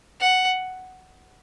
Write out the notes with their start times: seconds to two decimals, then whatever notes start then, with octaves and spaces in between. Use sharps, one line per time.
0.20 F#5